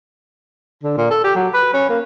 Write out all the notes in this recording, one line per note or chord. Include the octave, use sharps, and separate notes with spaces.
D3
A#2
A4
G4
F#3
B4
C#4
A#3